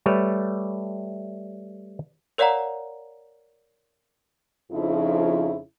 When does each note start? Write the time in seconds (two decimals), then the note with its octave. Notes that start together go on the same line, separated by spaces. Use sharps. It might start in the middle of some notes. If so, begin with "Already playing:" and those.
0.06 G3 A3 B4 C#5
2.38 A#4 C#5 D5 F5 F#5 A#5
4.71 F2 C#3 F3 D#4 E4